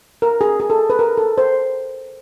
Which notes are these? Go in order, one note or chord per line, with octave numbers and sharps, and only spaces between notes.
A#4
G#4
G#4
A4
B4
A#4
A4
C5